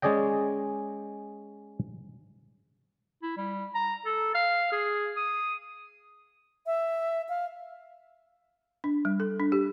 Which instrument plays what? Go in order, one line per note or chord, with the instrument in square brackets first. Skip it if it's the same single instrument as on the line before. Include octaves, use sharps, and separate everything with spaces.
[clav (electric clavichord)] G#3 C#4 G#4 D5 D#5 G5
[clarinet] E4
G3
A#5
A4
F5
G#4
D#6
[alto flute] E5
F5
[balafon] D4
G3
A4
D4
G4